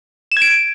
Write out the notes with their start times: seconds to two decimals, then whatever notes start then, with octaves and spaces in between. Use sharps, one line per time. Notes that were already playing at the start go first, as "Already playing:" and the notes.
0.32 E7
0.37 G#6
0.42 D7